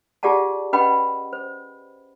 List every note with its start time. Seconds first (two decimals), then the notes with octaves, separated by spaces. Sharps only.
0.23 F4 G4 G#4 D5 F#5 A5
0.73 C#4 B4 D#5 F#5 G5 B5
1.33 C5